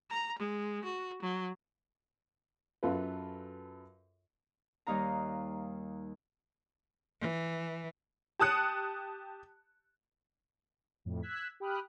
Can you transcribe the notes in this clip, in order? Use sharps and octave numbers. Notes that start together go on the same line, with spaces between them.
A#5
G#3
F#4
F#3
F#2 F4 A4 B4
D#2 G3 D#4 F5 A#5
E3
G4 A5 D#6 F#6 C#7
F2 A2
E6 F#6 G#6 B6
G4 G5 B5 D#6 F6 F#6